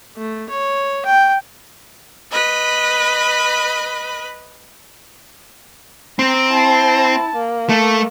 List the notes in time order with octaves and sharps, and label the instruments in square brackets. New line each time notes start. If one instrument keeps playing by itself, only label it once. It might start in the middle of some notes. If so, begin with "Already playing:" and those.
[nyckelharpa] A3
C#5
G5
[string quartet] B4 D#5 B5
[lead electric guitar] C4 [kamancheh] A#5
[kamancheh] E4 A5
A#3
[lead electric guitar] A3